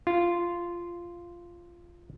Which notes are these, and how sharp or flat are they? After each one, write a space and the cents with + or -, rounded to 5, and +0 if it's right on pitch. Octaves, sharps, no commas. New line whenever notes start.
F4 -10